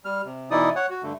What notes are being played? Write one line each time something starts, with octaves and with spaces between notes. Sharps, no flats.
G3 F6
C3
B2 E3 D#4 E4 D5 D#6
C#5 F#5
F#4
G2 D3 A3